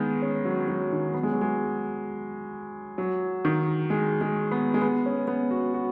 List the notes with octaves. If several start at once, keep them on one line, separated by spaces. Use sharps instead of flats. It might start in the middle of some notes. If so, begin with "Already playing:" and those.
Already playing: D#3 G#3 B3
C#4
F#3
F#3
D#3
B3
G#3
F#3
G#3
F#3
D#3
G#3
G#3
B3
G#3
B3
C#4
B3
F#4
F#4